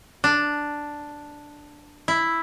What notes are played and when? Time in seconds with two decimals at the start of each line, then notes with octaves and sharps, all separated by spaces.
0.24 D4
2.08 E4